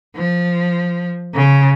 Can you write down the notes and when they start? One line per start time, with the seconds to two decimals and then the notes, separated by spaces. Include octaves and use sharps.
0.15 F3
1.34 C#3